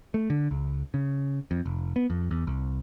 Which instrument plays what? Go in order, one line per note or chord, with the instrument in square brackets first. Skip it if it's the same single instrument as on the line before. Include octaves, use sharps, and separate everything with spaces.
[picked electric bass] A3
D3
C#2
C#3
F2
F1
B3
F2
E2
C2